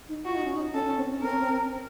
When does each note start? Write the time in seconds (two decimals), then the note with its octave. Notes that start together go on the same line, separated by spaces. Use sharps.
0.09 D#4
0.25 F4 F#4
0.35 D#4
0.45 C#4
0.54 D#4
0.74 C#4 A4
0.86 C#4
0.97 C4
1.09 C#4
1.22 C4 A#4
1.29 C#4
1.38 C4